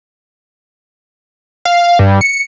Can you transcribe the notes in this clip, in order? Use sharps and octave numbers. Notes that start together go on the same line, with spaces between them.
F5
G2
C#7